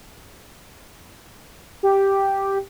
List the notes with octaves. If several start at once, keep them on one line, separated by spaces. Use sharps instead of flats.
G4